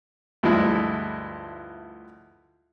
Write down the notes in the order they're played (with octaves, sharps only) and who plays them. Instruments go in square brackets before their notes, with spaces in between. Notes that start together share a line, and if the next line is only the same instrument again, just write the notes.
[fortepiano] D2 G2 F3 G#3 E4